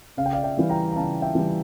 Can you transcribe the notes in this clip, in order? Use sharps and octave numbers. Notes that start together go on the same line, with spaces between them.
C#3 F5
G5
D5 F5
E5 G5
E3 G3
G5 A#5
A#5
C#3 F5 A5
E5 G5
E3 G3